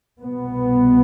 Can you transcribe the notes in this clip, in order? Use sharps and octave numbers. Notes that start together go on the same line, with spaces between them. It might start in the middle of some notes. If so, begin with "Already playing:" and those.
C2 B2 B3